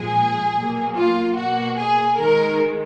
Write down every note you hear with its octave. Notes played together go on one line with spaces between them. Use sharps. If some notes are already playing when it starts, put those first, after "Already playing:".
Already playing: A#2 F3 G#3 G#4
B2 F#3 A#3
F4
B2 A#3 F#4
G#4
D#3 G#3 A#4